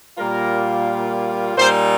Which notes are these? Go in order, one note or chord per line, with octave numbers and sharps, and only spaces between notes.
A#2 G3 A#3 F4 A#4
A#2 G3 D#4 C5